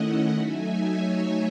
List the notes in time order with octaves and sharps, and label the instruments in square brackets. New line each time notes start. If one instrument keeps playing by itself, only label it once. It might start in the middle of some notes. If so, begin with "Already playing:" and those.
Already playing: [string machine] D#3 A3 C#4 E4 D#5 F#5
F#3 A3 D#4 E5 G#5
C#5 E5